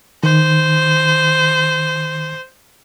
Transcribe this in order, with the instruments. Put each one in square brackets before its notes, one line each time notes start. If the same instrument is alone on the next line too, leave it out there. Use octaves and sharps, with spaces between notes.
[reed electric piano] D#3 [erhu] C5